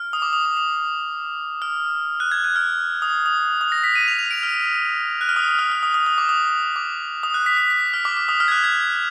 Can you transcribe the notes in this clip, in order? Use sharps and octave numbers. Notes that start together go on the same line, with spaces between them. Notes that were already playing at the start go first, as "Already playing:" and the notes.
Already playing: F6
D#6
D6
D#6
D6
D#6
F6
F#6
G#6
F#6
F6
D#6
D#6
D#6
A#6
B6
D#7
F7
F7
D7
F6
F#6
F6
D#6
D#6
F6
F6
D#6
D#6
D#6
D6
D#6
D6
D#6
F#6
B6
B6
B6
F6
D6
D6
D#6
F6
G#6
F#6
G#6